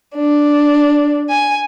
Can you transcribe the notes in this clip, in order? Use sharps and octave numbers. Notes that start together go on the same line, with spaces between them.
D4
G#5